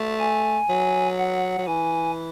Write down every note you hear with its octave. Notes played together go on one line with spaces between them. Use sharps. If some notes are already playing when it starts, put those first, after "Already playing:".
Already playing: A3
G#5
F#3
F#5
F#3
E3 G#5